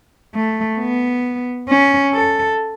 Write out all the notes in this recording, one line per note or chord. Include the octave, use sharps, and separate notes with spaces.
A3
B3
C#4
A4